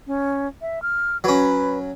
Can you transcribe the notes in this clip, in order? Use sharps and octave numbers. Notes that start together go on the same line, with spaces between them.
C#4
E5
F6
F#3 C#4 B4